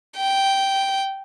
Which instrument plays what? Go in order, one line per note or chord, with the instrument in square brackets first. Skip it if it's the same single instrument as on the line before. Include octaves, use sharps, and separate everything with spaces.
[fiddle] G5